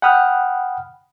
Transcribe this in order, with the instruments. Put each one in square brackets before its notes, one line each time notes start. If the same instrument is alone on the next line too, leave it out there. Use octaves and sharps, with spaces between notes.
[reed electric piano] F#5 G5 B5 D#6 F6 F#6